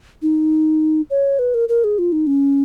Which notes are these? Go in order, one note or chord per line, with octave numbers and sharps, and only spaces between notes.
D#4
C#5
B4
A#4
A#4
G#4
F4
D#4
C#4